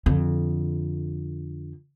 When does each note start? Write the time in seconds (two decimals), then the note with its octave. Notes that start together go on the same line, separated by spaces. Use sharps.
0.06 F2 D3